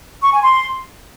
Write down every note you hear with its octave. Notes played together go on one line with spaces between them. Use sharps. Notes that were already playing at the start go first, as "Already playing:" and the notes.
C#6
G#5
C6